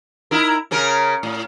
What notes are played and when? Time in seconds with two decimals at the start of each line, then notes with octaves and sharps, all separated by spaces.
0.31 D#4 E4 A#4
0.71 C#3 C#4 A#4
1.23 A2